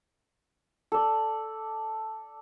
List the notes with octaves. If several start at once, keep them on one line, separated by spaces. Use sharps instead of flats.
A4 D5